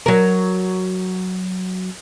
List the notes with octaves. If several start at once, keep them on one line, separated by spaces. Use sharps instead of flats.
F#3 A#4